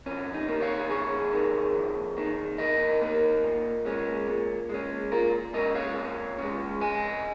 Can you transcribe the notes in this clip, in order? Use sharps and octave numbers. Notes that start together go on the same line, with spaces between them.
F2 C#4
D#4
D#3 A#3
C#5 F5
F2 G#4 C#5
D#3 A#3
F2
D#3 A#3
F2 A#4 D#5
D#3 A#3
A#2
G#3 C#4
A#2
G#3 C#4
A#2 F4 A#4
G#3 C#4 A#4 D#5
C#5 F5
A#2
G#3 C#4
F2 D#5 G#5